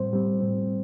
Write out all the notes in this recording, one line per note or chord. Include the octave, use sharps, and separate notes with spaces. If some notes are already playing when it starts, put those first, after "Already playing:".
Already playing: A2 G3 C4 C5
A2 G3 C4
A2 G3 C4